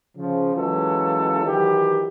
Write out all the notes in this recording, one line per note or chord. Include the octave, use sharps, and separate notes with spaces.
C#3 F3
E3 F#3 G#3 C#4 F4 A4
D#3 E3 F#3 G4